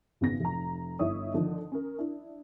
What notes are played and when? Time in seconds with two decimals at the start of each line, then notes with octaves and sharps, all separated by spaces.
0.21 G#1 C#3 B3 A#6
0.40 F1 A#5
0.99 G1 D#4 E4 C#5 E5 D#6
1.34 D3 D#3 F3 D#4
1.72 C#4 A#4
1.98 D4 E4